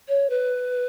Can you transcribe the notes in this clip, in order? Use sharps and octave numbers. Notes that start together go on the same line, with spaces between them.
C#5
B4